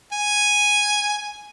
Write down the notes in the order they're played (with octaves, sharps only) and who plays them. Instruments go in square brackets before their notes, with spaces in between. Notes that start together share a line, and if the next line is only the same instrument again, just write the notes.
[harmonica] G#5